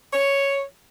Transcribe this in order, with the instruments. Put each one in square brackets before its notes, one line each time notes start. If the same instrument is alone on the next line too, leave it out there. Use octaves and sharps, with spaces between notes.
[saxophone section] C#5